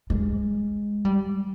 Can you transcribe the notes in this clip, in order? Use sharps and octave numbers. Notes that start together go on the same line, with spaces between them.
G#3
G3